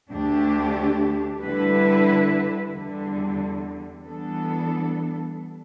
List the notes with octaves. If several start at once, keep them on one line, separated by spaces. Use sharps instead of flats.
D2 D3 A3 D4 G4
D3 G3 E4 B4
E2 D3 G3
E3 G3 B3 D4 A4